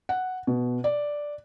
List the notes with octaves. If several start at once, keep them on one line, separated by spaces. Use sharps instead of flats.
F#5
B2
D5